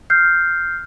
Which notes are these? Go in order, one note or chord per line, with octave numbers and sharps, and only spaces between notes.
F6 G6 C7